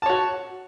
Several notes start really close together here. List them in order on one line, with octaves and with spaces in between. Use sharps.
A5 C#5 F#4